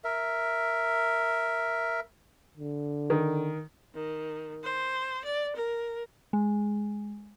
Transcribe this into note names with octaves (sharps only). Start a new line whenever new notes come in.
A#4 E5
D3
D#3
D#3
C5
D5
A#4
G#3